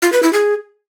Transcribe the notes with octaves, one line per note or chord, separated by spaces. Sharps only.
F4
B4
E4
G#4